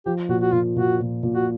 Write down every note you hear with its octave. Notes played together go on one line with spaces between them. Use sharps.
F3 G4
A#2 F#4
F#4
A#2 F4
A#2 F#4
A#2
A#2
F#4